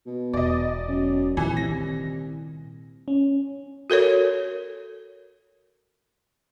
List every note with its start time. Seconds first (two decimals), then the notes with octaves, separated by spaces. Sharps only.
0.06 B2
0.34 E1 D5 D#5
0.88 F#2
1.37 D1 A#2 D#3 E3
1.57 C2 A#6
3.08 C#4
3.90 F#4 A4 A#4 C#5